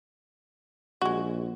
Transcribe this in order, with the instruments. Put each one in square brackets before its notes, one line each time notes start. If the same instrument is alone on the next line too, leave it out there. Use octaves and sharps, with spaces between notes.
[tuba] A#1 [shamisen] G#3 F#4